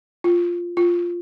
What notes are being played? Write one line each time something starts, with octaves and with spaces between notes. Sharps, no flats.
F4
F4